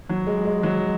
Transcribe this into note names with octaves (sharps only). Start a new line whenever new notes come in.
F#3
G#3
G#3
F#3